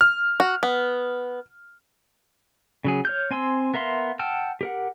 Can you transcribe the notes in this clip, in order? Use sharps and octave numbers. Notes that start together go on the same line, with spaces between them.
F6
F#4
B3
C#3 F#3 G#4
C#5 F6 G6
C4 G#5 C6 E6
B3 A#4 E5 F5 C6
F#5 G5 A5 E6 F6
G4 A#4 F#5